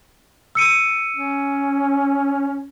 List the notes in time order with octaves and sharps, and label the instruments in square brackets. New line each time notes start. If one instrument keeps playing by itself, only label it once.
[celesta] E6 C#7 D#7
[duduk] C#4